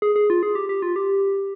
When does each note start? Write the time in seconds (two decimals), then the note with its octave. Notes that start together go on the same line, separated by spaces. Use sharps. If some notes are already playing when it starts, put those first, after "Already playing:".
0.02 G#4
0.16 G#4
0.30 F4
0.43 G#4
0.55 G4
0.69 G4
0.82 F4
0.96 G4